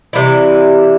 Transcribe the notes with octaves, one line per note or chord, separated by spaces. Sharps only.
C3 E3 G3 E4